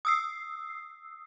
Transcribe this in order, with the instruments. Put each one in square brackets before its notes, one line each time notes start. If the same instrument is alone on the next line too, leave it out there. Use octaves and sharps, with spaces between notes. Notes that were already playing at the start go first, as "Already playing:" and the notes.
[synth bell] D#6 E6 C7